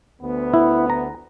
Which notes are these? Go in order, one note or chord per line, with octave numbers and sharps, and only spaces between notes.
D2 B3
E4
A#5